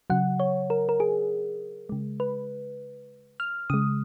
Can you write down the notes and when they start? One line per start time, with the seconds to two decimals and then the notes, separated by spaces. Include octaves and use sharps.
0.10 C#3 F#3 F#5
0.40 C#5
0.70 A#4
0.89 A#4
1.00 G#4
1.89 C#3 G#3
2.20 B4
3.40 F6
3.70 C#3 G#3 D#6